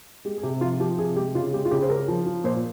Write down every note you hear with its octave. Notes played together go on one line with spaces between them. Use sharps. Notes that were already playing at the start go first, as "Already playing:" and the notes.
G#3 G4
G#4
C3 G4
F3 F4
F3 G4
C3 G#4
G#3 G4
C#3 F4
G#3 G4
F4
C#3 G4
C5
C#3 A#4
F3
F3
A#2 C5